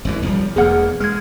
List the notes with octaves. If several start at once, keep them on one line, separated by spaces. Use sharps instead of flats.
G#1 F#2 E3
B1 F3 G3
E1 E2 A#3 G#4 F#5 F6
G#3 F6 G#6